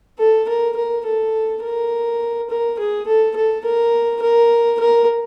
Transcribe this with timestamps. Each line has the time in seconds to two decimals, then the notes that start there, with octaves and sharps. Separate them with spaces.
0.19 A4
0.49 A#4
0.76 A#4
1.06 A4
1.63 A#4
2.50 A#4
2.79 G#4
3.07 A4
3.36 A4
3.65 A#4
4.22 A#4
4.80 A#4